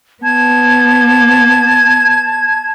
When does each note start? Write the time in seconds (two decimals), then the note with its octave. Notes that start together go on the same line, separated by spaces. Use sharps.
0.23 B3 A5 G#6